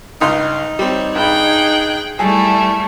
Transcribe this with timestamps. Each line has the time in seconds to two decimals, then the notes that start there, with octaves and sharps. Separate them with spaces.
0.21 C#2 G2 D#4 C6
0.79 G3 C4 C#5
1.16 G2 G#4 G5 B5 F#6
2.19 G3 A3 E4 G#4 A4